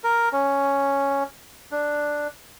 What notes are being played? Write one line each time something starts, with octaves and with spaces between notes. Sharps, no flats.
A#4
C#4
D4